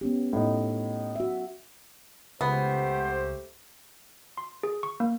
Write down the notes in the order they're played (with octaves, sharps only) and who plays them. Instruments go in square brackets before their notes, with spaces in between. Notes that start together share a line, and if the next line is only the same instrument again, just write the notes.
[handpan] B3 C#4 G4
[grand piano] A2 D#4
[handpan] F#4 E5
[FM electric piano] C#2 [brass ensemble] A3 G4 C5 [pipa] B3
[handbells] C6
G#4
C#6
A#3